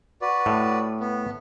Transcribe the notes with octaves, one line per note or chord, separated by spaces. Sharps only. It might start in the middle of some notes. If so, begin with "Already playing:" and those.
F#4 B4 D5
A2
B3